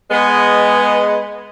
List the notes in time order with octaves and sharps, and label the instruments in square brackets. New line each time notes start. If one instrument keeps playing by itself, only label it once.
[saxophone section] G#3 B3